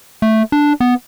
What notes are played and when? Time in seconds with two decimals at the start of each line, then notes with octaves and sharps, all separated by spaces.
0.22 A3
0.52 D4
0.80 B3